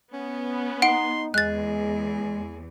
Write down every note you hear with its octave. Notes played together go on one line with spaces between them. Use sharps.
B3 C#4
D#4 F#5 C6 D7
E2 G#3 G#4 F#6 A6